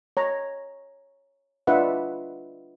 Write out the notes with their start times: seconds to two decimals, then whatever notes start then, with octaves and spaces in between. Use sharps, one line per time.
0.17 C#5 A#5
1.67 D4 F4 B4 D#5 E5 F#5